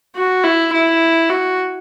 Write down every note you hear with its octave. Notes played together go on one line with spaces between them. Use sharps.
F#4
E4
E4
F#4